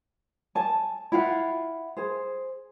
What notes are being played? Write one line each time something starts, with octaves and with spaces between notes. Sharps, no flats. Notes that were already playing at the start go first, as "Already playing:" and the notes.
G#5 A5
E4 F4 F5 F#5
G#4 C5